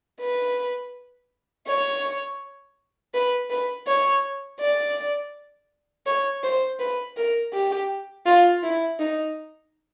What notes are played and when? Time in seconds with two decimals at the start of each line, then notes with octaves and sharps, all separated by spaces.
0.21 B4
1.67 C#5
3.14 B4
3.50 B4
3.87 C#5
4.60 D5
6.06 C#5
6.43 C5
6.79 B4
7.17 A#4
7.53 G4
8.26 F4
8.63 E4
8.99 D#4